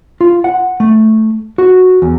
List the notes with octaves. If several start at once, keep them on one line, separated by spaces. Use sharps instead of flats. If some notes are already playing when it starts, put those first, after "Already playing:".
F4
F#5
A3
F#4
E2